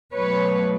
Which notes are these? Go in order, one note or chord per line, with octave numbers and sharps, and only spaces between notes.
B2 F#3 A3 B4 C#5